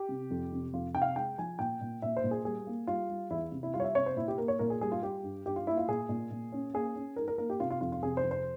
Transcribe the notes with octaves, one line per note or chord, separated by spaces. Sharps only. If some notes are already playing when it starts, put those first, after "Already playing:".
Already playing: G4
C3
F2
C3
F2 F4
C3 G5
F5
G#3 G5
F3 G#5
A#2 G5
A#2
A#2 E5
C5
A#2
G#4
G3 G#4
A#3
G3 F4
G3
E2 E4
C3
E4
G3 F4
C#5
E5
C3 C#5
C5
A#2 E4
G4
A#3 A#4
C#5
A#2 A#4
G#4
G3 G#4
F4
G3 G4
G2
G2 G4
F4
A#3 E4
F4
A#2 G#4
A#2
A#2
C#4
A#3 G#4
C#4
G#2 A#4
A#4
A#3 A#4
G4
C3 F4
F4
F2 F4
F4
C3 G#4
C5
F2
C5